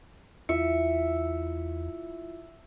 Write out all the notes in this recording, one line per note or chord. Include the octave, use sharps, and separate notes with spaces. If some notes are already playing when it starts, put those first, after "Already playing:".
E2 E4 F4 E5 C#7